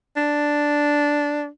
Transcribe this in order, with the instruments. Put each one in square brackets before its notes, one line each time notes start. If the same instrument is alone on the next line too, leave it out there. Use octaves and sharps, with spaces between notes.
[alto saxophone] D4